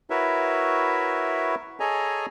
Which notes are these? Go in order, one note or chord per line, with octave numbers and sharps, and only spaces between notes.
E4 F#4 A#4 B4 C#5 E5
G#4 A4 C#5 D#5 G#5 A#5